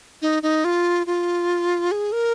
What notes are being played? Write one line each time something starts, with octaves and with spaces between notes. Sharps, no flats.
D#4
D#4
F4
F4
G#4
A#4